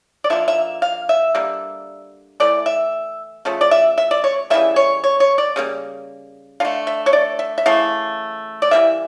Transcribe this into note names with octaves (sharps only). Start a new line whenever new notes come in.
D5
D3 F3 A#3 E5
E5
F5
E5
D3 G3 A#3
E3 A3 D5
E5
C#3 F3 A3
D5
E5
E5
D5
C#5
C#3 E3 G3 A#3 E5
C#5
C#5
C#5
D5
C#3 G3 A#3
D3 A3 F5
E5
C#5
D5
E5
E5
C#3 E3 A3 F5
D5
E3 G3 A#3 E5